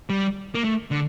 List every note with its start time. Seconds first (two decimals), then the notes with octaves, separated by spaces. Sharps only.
0.10 G3
0.55 A#3
0.64 A3
0.91 D3